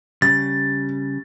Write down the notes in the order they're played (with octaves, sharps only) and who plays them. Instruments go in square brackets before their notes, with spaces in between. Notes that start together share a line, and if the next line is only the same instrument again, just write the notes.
[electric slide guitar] C#3 G3 [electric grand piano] A6